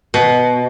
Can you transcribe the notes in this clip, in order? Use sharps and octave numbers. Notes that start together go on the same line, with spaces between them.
B2